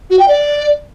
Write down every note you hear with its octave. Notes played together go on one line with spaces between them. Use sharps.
F#4
G5
D5